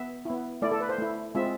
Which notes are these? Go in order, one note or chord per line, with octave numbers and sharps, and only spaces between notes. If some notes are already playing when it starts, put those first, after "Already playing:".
Already playing: B3 E5
B3 E4
A3 E4 D5
A4
B4
C5
A3 E4
G#3 C4 F4 E5